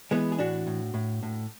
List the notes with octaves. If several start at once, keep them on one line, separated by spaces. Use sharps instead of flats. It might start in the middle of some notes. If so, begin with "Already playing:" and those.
E3 G#3 B3
G#4
A2 D4 F#4
A2
A2
A2